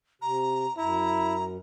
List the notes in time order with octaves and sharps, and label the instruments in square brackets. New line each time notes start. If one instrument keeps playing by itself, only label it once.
[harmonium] C3 [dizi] A#5
[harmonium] F#2 [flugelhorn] E4 [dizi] A#5